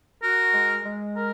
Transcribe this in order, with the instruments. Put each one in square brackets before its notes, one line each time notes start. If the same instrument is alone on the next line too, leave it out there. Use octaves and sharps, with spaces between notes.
[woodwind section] F#4 [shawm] A#4
[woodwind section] G#3
G#3
A#4